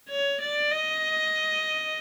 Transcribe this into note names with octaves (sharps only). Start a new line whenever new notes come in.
C#5
D5
D#5